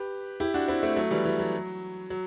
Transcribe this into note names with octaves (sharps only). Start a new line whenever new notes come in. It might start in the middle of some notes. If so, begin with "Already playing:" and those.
Already playing: G4 B4
E4 G4
D4 F#4
C4 E4
A3 C4
F#3 A3
E3 G3
E3
F#3
F#3